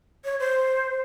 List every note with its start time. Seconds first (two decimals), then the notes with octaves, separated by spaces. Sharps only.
0.25 C#5
0.40 C5